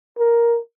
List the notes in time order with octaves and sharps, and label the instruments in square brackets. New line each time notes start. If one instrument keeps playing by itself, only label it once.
[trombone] A#4